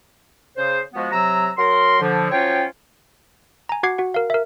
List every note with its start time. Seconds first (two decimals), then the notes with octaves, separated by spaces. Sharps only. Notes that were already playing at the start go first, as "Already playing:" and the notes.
0.56 C#3 C5
0.94 F3 G#3 B3 F#4
1.12 C3 F#3 A#5 E6
1.57 F#3 A#4 C6
2.00 D3 F3
2.31 F3 F#3 C#4 F4 C#5 G5
3.69 G#5 A#5
3.83 F#4 F#5 D6 G#6 C7
3.98 F#4 F#5
4.14 A#4 F5
4.30 A#4 E5